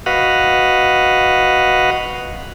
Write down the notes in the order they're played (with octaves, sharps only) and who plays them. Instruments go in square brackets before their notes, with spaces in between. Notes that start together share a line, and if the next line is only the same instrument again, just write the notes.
[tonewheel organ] F#4 B4 D#5 F5 F#5